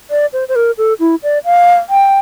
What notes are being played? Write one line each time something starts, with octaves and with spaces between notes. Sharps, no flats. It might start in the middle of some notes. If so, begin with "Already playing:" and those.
D5
C5
C5
A#4
A4
E4
D5
F5
G5